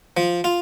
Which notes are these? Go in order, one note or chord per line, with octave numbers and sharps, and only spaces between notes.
F3
F4